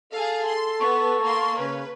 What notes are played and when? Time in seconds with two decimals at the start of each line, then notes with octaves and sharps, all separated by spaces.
0.13 G#4 A4 F5 A5
0.47 C6
0.81 B3 C#6
1.23 A#3 C6
1.58 C#3 C#4 B4